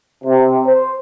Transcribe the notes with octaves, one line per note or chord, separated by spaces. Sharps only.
C3
C5